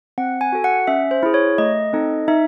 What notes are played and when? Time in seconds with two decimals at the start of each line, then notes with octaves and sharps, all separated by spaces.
0.18 C4 F#5
0.41 G#5
0.53 F#4 A4
0.64 F#5
0.87 C#4 E5
1.11 C5
1.23 E4 G#4
1.34 C#5
1.58 A3 D#5
1.93 C4 D#4 A4
2.28 D#4 E5